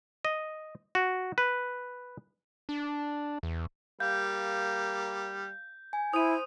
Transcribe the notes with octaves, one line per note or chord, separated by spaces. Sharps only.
D#5
F#4
B4
D4
E2
G3 A#3 F5 G6
G#5
E4 C5 D#6 D#7